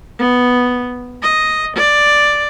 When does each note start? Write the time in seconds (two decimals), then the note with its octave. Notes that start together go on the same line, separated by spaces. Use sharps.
0.19 B3
1.23 D#5
1.76 D5